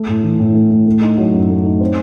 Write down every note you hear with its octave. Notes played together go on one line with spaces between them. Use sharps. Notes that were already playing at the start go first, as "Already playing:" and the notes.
Already playing: A3
A2
E3
A2
A3
A2
A3
D#4
F#3
F#2
A3
D#4
C4